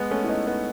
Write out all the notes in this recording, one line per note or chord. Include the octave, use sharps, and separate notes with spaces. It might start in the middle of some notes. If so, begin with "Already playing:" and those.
Already playing: G#3 B3
A3 C#4
E4
B3 D#4
B3 D#4